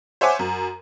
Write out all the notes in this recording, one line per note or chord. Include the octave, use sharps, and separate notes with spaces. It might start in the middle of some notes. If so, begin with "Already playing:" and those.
C5 C#5 E5 F#5 G#5 D6
F#2